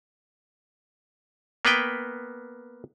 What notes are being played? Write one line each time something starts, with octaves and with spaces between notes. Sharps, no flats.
A#3 B3 B4 G5